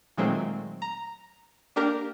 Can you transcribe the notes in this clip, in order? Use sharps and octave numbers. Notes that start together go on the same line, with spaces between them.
A#2 D#3 F#3 G#3 A3 C4
A#5
A#3 D4 G4 A#4